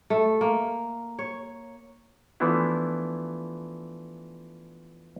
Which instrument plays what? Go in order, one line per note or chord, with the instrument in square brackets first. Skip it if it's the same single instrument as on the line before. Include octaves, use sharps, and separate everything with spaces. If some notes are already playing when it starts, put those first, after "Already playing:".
[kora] A3
A#3
C#5
[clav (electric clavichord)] E3 F3 A3 B3 D4 E4